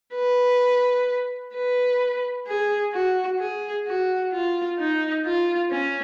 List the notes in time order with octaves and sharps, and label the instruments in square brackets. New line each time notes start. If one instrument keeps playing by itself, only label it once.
[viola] B4
B4
G#4
F#4
G#4
F#4
F4
D#4
F4
C#4